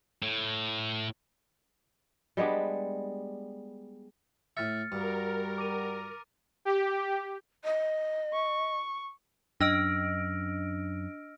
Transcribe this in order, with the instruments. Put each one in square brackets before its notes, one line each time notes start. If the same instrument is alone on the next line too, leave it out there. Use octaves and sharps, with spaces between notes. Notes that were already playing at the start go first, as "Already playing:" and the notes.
[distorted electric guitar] A2
[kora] G3 G#3 B3 D4
[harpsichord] A2 E5 [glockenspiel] F6 A6 C#7
[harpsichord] G2 [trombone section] G3 F#4 [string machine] A#4
[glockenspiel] D6 D#7
[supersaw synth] G4
[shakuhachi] D#5
[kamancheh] C#6
[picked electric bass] F#2 [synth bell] D4 D#5 D7 [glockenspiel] E6 F6 A#6